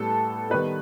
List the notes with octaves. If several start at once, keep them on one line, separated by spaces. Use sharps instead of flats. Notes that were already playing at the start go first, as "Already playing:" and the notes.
Already playing: A2 G3 B3 A4
D#3 G3 B3 B4